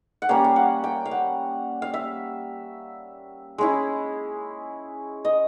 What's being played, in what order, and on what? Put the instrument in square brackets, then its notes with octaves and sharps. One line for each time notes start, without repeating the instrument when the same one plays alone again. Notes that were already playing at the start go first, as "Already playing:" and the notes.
[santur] F#5
G3 A#3 C#4 F5
F5
F#5
G5
F5
F#5
F5
E5
G#3 C#4 E4
D#5